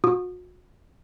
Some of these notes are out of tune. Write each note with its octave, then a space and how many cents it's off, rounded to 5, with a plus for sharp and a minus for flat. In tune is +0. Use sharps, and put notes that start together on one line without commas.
F#4 -40 D#6 -25